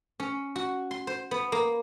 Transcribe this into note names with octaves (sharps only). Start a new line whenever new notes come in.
C#4
F#4
C6
C5
B3
A#3